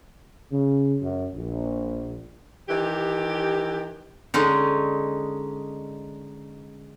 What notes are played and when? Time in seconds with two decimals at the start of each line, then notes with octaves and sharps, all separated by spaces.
0.52 C#3
1.01 F#2
1.34 A#1
2.68 D#3 E3 G4
4.34 D3 G#3 C#4 D#4